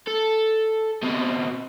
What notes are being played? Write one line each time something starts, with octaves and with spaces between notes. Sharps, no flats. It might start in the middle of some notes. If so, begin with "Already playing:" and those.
A4
B2 C4